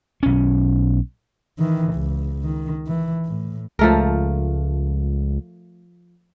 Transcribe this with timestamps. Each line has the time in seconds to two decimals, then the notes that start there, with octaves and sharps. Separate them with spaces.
0.23 B1 C#4
1.59 D#3 E3
1.93 C#2
2.44 D#3
2.86 E3
3.25 A2
3.79 C#2 F3 A3 A#4